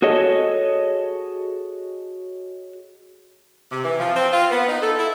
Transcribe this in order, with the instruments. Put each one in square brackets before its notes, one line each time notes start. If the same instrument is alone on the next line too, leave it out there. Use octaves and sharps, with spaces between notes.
[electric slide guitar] F#4 G#4 A4 C#5 D#5
[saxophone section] C3
E3
F3
C4
F4
B3
D#4
A4
E4